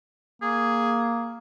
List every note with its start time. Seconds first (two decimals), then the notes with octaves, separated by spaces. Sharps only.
0.42 A#3 G#4